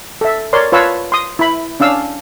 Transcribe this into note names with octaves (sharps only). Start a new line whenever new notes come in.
A4 E5
A#4 C#5 D5 C6
F4 B4 C#5 F5 A5 E6
C6 D#6
E4 B5
C#4 D4 F5 E6